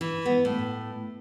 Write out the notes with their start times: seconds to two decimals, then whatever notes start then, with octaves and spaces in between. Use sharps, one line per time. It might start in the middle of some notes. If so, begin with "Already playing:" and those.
0.01 E3
0.26 B3
0.45 A2